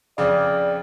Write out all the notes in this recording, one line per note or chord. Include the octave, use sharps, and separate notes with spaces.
F2 C#3 D5